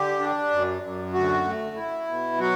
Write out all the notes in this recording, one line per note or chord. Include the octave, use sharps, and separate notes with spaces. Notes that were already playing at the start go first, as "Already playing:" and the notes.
Already playing: D3 G4
D4
F#2
F#2
D2 F#4
A3
E4
B2
F#3 F#4